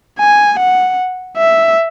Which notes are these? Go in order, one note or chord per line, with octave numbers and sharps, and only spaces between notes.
G#5
F#5
E5